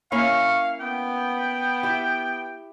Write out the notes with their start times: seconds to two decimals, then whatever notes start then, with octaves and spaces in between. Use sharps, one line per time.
0.12 A#3 C#4 E4 F5 C#6
0.80 B3 G5
1.83 E4 G4